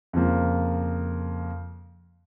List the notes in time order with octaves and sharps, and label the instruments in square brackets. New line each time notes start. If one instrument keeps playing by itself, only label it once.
[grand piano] F2 C#3 F3 A#3